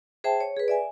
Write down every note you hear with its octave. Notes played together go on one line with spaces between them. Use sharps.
G#4 C5 E5 G5 A5
C#5
G#4 B4
D5 E5 G#5